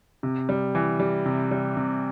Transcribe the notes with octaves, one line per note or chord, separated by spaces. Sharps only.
C3
G3
E3
G3
C3
G3
C3